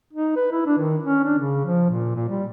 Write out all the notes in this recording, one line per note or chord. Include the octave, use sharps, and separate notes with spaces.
D#4
B4
E4
D4
D#3
C#4
D4
C#3
F3
A#2
A#2
G3